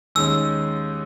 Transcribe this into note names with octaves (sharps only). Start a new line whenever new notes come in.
D#2 D#3 G#3 C#4 E6